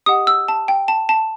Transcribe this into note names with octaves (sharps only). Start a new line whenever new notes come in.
G4 D#5 F#5 D#6
E6
A5
G5
A5
A5